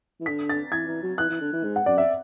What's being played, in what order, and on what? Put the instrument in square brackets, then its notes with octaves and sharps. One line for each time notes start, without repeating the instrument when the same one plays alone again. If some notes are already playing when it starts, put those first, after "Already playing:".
[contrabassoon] E3
[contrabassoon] D3 [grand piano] B6
[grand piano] A6
[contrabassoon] E3 [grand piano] G#6
[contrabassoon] E3
F#3
[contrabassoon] E3 [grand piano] F#6
[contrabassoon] E3
D3
E3
G#2
[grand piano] F#5
[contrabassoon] F#2 [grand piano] D5
[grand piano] E5